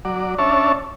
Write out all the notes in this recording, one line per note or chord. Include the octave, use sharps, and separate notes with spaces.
F#3 D5
C#4 D4 C#5 E5 A5